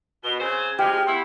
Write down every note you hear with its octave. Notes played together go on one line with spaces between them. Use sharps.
B2 G7
C#3 C4 C5 G#5
D2 F3 G#3 G4 F6
B3 E4 C6